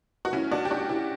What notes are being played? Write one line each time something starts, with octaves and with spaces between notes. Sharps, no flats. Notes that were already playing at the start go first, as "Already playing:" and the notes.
F#4
C#4 E4
D4 F#4
G4
D4 F#4
E4 G4